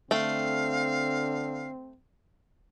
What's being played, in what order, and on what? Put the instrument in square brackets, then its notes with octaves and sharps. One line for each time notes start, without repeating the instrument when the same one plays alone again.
[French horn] D3 [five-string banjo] A3 G5 [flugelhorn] C4 [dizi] F5